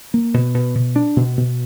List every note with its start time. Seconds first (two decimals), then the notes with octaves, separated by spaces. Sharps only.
0.14 A#3
0.34 B2
0.54 B2
0.75 B2
0.96 D4
1.16 B2
1.37 B2